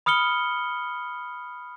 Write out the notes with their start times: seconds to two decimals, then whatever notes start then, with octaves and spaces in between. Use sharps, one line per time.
0.06 B5 D#6 F6 C#7 G7